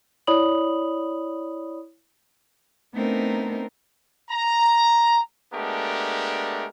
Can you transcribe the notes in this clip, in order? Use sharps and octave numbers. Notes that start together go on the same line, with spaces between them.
E4 C#5 D5 B5 D#6 F#7
A3 B3 C4 D4 D#4 A#4
A#5
G#3 A3 B3 D4 G4 A#4